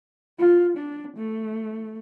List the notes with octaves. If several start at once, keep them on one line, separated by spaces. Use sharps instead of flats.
F4
D4
A3